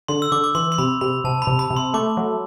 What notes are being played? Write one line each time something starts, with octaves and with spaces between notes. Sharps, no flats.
D3 C6
E6
D3 D6
D6
E3 C6
C6
C3 B5
C3 B5
C3 A5
B5
C3
B5
C3
C6
A3 D6
F#3